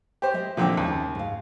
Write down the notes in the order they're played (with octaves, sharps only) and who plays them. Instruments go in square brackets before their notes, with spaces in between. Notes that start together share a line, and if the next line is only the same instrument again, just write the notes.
[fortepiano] G4 C5
[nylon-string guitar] G#3 D#5 E5
[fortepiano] A#2 D3 C4 [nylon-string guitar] D#3 F3
[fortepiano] D#2 [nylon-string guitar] C#3 G#3
[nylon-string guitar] G#2 F5